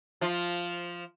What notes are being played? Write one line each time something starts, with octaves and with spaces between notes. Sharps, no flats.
F3 F4